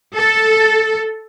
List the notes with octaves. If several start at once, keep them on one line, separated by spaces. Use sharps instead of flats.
A4